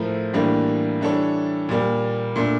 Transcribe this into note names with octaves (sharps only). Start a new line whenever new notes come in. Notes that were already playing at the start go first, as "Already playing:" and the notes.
Already playing: A2 F3 A3 E4 A#4
A2 E3 G3 A#3 D4
E3 G3 D4 A4 C#5
A#2 G3 A#3
A#2 A3 D4